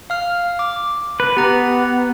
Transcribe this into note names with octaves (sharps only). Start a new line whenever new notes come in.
F5 F6
D6
B4
B3 G4 A#5